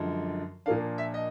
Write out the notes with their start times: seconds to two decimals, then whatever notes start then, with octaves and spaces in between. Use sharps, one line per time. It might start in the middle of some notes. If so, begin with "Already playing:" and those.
Already playing: F#2 D3 F3 G#3
0.66 A#2 F3 A#3 D4 F5
0.98 E5
1.14 D#5